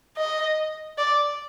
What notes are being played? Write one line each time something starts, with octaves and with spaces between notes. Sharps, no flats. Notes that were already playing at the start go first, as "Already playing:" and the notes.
D#5
D5